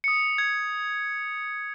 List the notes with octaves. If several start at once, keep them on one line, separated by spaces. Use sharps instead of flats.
D#6 C#7
G#6